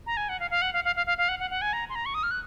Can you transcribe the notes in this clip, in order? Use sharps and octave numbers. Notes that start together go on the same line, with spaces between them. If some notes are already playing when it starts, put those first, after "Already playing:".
A#5
G#5
F#5
F5
F5
F#5
F5
F5
F5
F5
F5
F#5
F#5
F#5
G#5
A#5
C6
A#5
C#6
D#6
F6
F#6